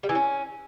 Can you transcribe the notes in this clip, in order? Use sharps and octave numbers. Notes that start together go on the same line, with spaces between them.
G3
E3
C#4